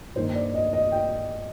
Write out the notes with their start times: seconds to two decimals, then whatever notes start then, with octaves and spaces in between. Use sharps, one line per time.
0.16 G2 D#3 A#3 C5
0.35 D5
0.54 D#5
0.73 D#5
0.92 G5